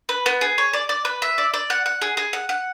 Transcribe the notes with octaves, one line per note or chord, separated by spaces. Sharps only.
B4
B3
G#4
C#5
D5
D5
B4
E5
D5
D5
F#5
F#5
G#4
G#4
F#5
F#5